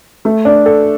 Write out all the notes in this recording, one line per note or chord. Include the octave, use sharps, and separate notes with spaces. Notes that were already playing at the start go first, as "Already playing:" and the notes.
A3
D4
A4